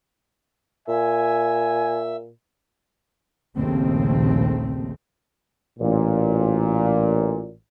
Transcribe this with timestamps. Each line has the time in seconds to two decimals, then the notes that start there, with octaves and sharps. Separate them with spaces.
0.88 A#2 E5 G#5
3.56 A#1 D#2 C#3 A3 C4
5.78 A1 A#2